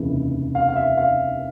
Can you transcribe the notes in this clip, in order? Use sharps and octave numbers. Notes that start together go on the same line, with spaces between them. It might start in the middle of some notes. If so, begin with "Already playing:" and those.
Already playing: F1 D#2 C#3 E3
F5
F5
E5
F5